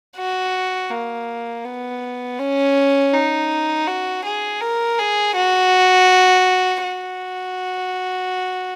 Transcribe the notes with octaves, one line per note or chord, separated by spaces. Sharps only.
F#4
A#3
B3
C#4
D#4
F#4
G#4
A#4
G#4
F#4
F#4